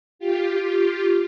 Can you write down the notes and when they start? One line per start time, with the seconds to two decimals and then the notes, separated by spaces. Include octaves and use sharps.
0.19 F4 G4